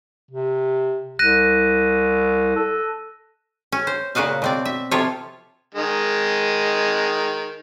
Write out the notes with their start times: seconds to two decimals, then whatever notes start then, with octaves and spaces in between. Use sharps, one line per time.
0.31 C3
1.19 C2 F#6 A#6 D#7
2.56 A4
3.72 C#4
3.87 C5
4.15 A#2 C#3 F#4 D#5 F5
4.42 B2 C4 D5
4.65 E5
4.91 C3 F3 F4 A4 C#5
5.74 D#3 G#3